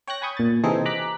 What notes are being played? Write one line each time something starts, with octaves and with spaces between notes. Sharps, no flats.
C#5 G5 C#6 F#6 A#6
G#5 B5 C#6 D#6 G6
A#2 A6
C3 E3 C4 D#4 G#4 A4
A#5 D6 F#6 B6